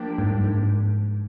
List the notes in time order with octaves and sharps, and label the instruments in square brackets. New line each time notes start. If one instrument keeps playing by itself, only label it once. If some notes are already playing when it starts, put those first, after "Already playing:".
Already playing: [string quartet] F3 A#3 D4 G4
[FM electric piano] G#2
G2
G#2